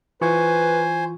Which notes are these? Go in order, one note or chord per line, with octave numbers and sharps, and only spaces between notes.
E3 F4 B4 C5 G#5 C#6